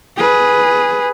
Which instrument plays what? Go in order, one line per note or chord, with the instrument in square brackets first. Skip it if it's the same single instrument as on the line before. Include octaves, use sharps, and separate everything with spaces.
[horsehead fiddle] G#4 B4